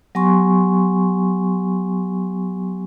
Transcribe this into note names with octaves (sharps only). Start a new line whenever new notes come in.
F#3 B3 G4 G#5 C6 C#6